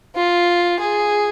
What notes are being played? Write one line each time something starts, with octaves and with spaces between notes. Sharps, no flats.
F4
G#4